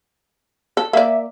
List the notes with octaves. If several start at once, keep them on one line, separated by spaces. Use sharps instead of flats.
A4
A#3 D5 E5